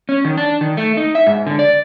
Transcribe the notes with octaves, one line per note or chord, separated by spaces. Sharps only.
C#4
D#3
D4
D#3
A3
D#4
E5
G#2
D3
D5